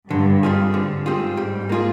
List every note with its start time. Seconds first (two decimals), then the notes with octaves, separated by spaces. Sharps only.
0.10 G2 D3
0.43 G3 C4 F4 G#4
0.74 G#2 D3
1.06 G3 C4 F4 G#4
1.37 G3
1.69 A#3 F4 G#4